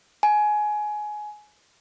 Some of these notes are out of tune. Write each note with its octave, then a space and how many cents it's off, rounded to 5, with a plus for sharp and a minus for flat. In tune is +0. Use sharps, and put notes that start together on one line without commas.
G#5 +20